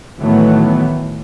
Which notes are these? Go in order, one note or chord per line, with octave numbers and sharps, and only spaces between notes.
A2 D#3 E3 F#3 A3 B3